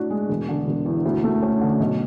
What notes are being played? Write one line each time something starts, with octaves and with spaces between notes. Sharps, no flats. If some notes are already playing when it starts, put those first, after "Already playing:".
Already playing: A2 D4 F#4
G#3
E1
D3
E1
E2
D2
A3
C#4
D3
B1